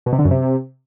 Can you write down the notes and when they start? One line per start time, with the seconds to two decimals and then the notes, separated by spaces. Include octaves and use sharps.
0.06 B2
0.12 C3
0.19 D3
0.25 F#2
0.31 C3